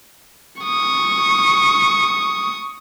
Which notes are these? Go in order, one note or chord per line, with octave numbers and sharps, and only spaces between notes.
C#6 D#6